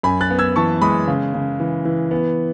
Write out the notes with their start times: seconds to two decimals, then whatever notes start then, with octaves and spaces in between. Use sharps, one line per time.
0.03 F#2 G#5 B5
0.21 F#6 A6
0.30 B3
0.39 E6 G#6
0.56 E3 A5 C#6
0.81 G#3 B5 D#6
1.07 C#3
1.34 C#3
1.60 E3
1.85 E3
2.11 B3